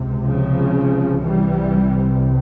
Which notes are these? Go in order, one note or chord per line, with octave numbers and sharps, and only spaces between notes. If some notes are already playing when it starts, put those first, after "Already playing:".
Already playing: C#2 C3
C#3 F3
C2 C3 E3 G3